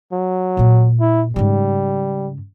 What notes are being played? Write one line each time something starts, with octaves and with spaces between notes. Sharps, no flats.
F#3
A#2 A#3
E4
G#2 C#3 G3